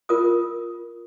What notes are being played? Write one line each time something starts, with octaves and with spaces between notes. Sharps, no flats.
F4 A#4 D#6